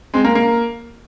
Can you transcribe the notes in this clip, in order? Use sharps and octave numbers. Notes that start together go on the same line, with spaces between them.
G#3 C4
A#3
A#3